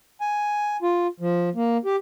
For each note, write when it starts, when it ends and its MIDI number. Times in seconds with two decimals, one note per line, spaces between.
0.21 0.77 80
0.82 1.07 65
1.20 1.49 53
1.56 1.77 58
1.85 1.96 67